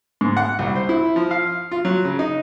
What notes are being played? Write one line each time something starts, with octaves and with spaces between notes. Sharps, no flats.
G#2
F#5
C2
C5
E4
F3
F5
F4
F#3
C#3
D#4